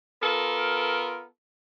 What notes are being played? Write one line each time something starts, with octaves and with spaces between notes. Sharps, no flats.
B3 F4 A4 A#4